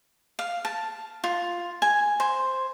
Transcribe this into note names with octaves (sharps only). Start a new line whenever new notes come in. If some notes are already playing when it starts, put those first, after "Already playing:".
F5
A5
F4
G#5
C5